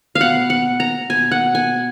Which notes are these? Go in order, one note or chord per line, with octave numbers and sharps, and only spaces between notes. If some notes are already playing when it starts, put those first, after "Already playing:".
F5
B2 F#5
F#5
A#5
B2 G#5
F#5
G#5